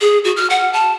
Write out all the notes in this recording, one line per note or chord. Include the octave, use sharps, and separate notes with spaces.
G#4
F#4
F6
F#5
A5